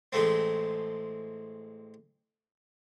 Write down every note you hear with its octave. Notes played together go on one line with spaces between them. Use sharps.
A1 G#3 A3 C4